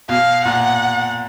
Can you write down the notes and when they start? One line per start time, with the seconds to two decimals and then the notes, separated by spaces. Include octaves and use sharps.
0.09 B2 F5
0.44 A#2 F#5